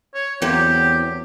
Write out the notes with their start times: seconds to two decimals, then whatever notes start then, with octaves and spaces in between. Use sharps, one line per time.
0.14 C#5
0.42 E2 F#3 A#3 C4 G4